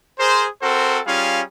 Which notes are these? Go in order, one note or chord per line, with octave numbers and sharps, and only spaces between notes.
G#4 A#4 C5
C4 F#4 A4 A#4 C5
G3 C#4 F4 G#4 F5